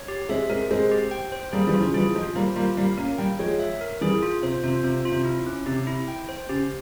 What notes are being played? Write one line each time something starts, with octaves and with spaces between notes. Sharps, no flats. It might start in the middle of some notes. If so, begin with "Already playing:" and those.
Already playing: C#5
G4
G#3 C4 E5
G#3 C4 A#4
G#3 C4 C5
G4
G5
C5
G3 A#3 G#4
E3 G3
F4
C#3 F3
E3 G3 G#4
F3 G#3 F4
G3 A#3 C5
G3 A#3 F4
G3 A#3 F5
A#3 C#4 A#4
G3 A#3 G5
F3 G#3 C#5
E5
A#4
E3 G3 G#4
F4
C3 C5
C3 F4
C3 C5
F4
C3
E4
C#4
C3 G4
E4
G5
C5
C#3 G4